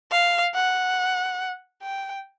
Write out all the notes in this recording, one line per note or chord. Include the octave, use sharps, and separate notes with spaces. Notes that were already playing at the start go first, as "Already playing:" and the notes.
F5
F#5
G5